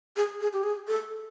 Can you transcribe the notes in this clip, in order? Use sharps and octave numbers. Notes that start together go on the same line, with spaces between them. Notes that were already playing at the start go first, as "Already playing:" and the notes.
G#4
G#4
G4
G#4
A4